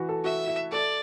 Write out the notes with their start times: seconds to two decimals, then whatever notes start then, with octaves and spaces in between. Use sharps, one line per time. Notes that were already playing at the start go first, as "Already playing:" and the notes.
Already playing: E3 F#4
0.09 A4
0.24 F#4 E5
0.47 E4
0.72 A4 D5